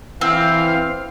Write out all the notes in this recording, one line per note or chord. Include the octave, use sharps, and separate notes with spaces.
E3 C4 F5